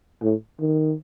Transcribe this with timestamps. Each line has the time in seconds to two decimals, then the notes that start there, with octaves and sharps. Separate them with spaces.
0.22 A2
0.60 D#3